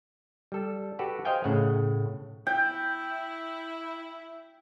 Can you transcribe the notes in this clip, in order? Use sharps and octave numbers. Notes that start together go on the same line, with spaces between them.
G3 A4
F#4 G4 A4 B4 F#5
C5 D#5 F5 G5 G#5
A2 C#3 F#5
E4 G5